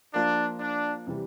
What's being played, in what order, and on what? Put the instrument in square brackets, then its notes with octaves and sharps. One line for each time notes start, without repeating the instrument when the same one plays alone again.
[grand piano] F3 A#3 F4 A#4 [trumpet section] D4
[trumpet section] D4
[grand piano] C3 E3 G3